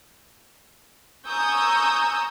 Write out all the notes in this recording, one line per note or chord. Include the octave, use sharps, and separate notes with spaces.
G#5 A#5 C#6 D#6 E6 G6